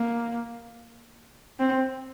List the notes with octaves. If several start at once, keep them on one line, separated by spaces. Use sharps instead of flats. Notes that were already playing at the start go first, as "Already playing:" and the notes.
Already playing: A#3
C4